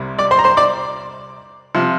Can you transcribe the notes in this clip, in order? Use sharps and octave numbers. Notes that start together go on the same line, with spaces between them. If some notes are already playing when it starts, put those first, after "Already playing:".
Already playing: C2 C3 G3
D5 D6
C5 C6
A#5
C5 C6
D5 D6
C3 F3